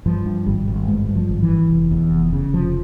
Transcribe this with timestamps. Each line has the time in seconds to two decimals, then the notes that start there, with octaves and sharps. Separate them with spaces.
0.06 G2 F3
0.26 G2
0.47 G#1 G3
0.68 G#1
0.88 G2 G#3
1.09 G2
1.15 F3
1.29 G#1
1.42 E3
1.50 G#1
1.71 F1
1.91 E2
2.12 F1
2.33 C#3
2.53 F1 F3